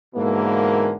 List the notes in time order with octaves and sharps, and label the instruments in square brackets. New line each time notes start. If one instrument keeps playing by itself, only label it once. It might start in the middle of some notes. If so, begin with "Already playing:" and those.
[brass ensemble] G#2 B2 D3 E3 A#3